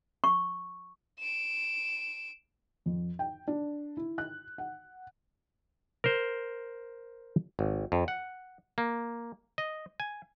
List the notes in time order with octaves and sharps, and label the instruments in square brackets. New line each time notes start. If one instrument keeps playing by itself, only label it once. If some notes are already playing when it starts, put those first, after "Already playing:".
[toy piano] C#6
[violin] D7 E7
[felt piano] F2
G5
D4
E4
F#6
F#5
[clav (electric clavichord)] A#4 C5
G#1
F2
F#5
A#3
D#5
G#5